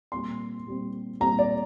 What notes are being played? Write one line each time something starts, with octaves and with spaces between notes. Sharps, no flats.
A#2 G3 C4 C6
A#2 G3 C4
A#2 G3 C4 A#5
D5